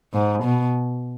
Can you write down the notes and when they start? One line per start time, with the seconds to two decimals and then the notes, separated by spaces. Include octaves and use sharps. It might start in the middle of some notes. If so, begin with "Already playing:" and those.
0.14 G#2
0.44 B2